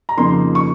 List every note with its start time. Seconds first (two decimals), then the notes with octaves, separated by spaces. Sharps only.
0.09 A#5
0.17 F2 C#3 F3 A#3 D#4 C6
0.55 C#6